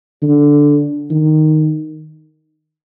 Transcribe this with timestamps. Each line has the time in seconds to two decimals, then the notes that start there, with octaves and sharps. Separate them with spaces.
0.22 D3
1.11 D#3